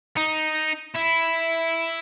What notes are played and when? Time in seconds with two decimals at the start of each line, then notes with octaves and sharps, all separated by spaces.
0.17 D#4
0.95 E4